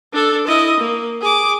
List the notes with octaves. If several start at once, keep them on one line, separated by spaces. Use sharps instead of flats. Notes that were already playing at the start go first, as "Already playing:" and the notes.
D4 A4
E4 D#5
A#3
G#4 D6